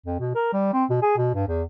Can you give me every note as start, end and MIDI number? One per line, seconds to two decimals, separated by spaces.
0.06 0.17 41
0.19 0.30 47
0.35 0.48 70
0.53 0.73 55
0.73 0.84 60
0.90 0.97 47
1.02 1.15 68
1.17 1.29 47
1.34 1.45 43
1.48 1.63 40